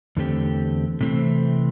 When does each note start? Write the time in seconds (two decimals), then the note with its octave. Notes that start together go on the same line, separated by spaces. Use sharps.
0.17 E2 D3 A3 C4 G4
1.01 C3 E3 A3 C4